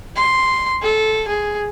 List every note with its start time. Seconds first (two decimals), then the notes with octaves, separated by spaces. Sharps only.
0.16 C6
0.82 A4
1.28 G#4